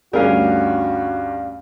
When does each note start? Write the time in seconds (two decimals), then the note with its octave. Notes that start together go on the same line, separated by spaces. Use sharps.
0.13 D2 G2 C#4 F#4 G#4 A#4 D5 F5